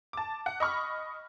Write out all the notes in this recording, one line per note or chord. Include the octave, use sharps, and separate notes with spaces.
A5 D6
F#5
D#5 B5 C#6 F6